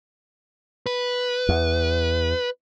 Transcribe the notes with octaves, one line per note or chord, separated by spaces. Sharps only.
B4
E2